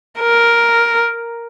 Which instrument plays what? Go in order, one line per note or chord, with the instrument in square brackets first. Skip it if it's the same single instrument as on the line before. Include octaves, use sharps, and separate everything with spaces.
[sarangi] A#4